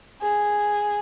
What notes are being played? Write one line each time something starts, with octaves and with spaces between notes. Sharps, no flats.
G#4